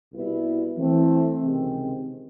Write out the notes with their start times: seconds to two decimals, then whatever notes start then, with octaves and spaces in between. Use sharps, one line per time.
0.12 C2 B2 G3 B3 E4
0.77 E3 A3 C4
1.41 C#2 C3 D#3 G#3 C4